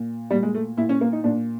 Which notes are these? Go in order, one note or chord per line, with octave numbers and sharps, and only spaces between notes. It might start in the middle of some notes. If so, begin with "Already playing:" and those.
Already playing: A#2
A#2 G3
G#3
A3
A#2 E4
C#4
A#3
D#4
A#2 D4